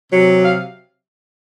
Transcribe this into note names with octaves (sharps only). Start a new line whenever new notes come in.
C3 F#3
F5